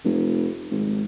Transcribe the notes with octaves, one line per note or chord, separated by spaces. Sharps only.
F1
G#1